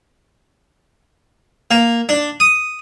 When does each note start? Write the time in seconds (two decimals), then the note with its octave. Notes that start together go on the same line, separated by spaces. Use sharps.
1.71 A#3
2.09 D4
2.40 D#6